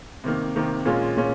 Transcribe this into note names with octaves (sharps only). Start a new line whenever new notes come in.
C3 D#3 A#3
C3 D#3 A#3
A#2 G#3 C#4 F4
A#2 G#3 C#4